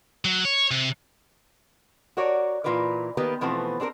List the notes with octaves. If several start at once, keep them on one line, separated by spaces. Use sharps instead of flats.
F#3
C#5
C3
F#4 A#4 C#5 D5
A#2 E3 F4 A#4 B4 D5
D#3 A#3 B3 G4 A#4 B4
B2 E3 F3 A3 B3 C4
C4 D4 G4 A#4